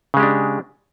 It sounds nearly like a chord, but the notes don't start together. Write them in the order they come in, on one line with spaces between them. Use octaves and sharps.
C#3 G#3 G4 D4